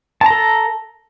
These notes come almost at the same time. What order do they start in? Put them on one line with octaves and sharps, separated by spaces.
A5 A#5 A4